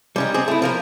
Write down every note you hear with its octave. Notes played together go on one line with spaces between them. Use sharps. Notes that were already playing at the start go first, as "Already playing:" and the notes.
G3 C#4 D#4
C4 G#4
A3 E4
F3 A#3 A#4